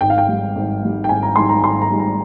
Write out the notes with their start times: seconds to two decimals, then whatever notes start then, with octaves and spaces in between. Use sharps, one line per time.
0.01 G#1 G5
0.10 F5
0.18 G5
0.28 G#2 G3
0.56 G#1
0.83 G#2 G3
1.04 G5
1.09 G#1 G#5
1.23 A#5
1.36 G#2 G3 C6
1.49 A#5
1.63 G#1 C6
1.82 A#5
1.91 G#2 G3
2.00 A#5